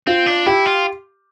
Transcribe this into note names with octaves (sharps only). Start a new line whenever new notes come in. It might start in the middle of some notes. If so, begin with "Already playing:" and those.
C4 F4
D4
E4 G4
F4